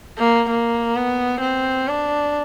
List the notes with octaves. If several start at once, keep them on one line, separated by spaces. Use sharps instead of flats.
A#3
A#3
B3
C4
D4